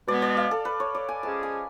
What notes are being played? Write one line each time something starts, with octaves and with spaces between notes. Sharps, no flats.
B2 G#3 B3 D5
D5
F5
A4
B4
C#5
D5
G#5
F3 G#3 C#4 G#4 A5
G#5